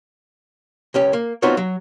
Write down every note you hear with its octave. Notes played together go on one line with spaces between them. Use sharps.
C#2 C#4 G4
A#3
B3 C4 D#4 F4 F#4 C#5
F#3